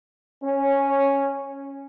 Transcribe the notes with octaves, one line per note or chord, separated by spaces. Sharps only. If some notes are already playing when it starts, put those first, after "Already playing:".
C#4